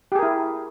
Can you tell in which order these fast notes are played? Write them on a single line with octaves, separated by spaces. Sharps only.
G4 G#4 A#4 E4